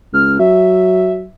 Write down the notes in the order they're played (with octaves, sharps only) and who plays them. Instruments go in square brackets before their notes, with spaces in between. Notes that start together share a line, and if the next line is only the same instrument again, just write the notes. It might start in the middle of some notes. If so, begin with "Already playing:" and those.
[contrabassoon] C#2 [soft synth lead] F6
[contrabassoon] F#3 [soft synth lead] E5